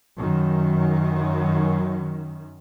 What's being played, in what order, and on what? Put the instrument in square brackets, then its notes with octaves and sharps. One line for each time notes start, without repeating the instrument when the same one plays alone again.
[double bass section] F#2 D#3